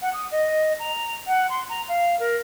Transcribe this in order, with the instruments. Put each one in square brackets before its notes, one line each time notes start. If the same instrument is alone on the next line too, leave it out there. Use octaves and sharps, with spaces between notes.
[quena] F#5
D#6
D#5
A#5
F#5
C6
A#5
F5
A#4